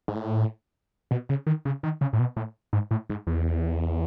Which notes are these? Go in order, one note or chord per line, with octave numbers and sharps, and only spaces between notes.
G#2
A2
B2
C#3
D#3
C#3
D#3
C#3
A2
B2
A2
G#2
A2
G#2
E2